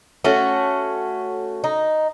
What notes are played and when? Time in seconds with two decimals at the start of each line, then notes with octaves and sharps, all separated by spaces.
0.24 A3 C#4 F#4
1.64 D#4